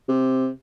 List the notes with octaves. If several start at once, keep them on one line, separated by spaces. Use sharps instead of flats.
C3